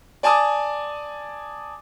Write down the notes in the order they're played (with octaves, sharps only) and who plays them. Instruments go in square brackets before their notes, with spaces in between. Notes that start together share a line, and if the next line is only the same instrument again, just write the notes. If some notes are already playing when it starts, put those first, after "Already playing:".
[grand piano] D5 G#5 A5 D6 D#6